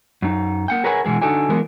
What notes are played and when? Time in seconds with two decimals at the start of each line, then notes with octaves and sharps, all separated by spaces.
0.22 F#2 D#4
0.68 A#3 F#5 G5
0.84 G#4 A#4 B4 C#5 F#5 G#5
1.05 B2 E3 G#3 G#4
1.22 D3 D#4 F#4 A4 D5 G#5
1.49 E3 F#3 G#3 B3 A#4